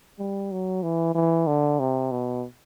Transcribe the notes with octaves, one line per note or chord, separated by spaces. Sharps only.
G3
F#3
E3
E3
D3
C3
B2